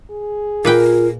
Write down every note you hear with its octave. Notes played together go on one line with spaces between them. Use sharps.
G#4
A#2 F4 A#4 B4 G5